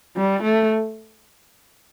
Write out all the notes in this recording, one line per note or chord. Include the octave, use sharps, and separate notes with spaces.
G3
A3